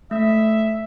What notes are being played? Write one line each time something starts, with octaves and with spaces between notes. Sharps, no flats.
A3 E5